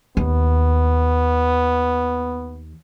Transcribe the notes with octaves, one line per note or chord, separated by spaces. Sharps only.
D#2 B3